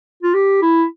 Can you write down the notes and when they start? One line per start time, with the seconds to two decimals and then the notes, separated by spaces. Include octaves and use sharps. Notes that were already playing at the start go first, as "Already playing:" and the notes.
0.23 F4
0.34 G4
0.62 E4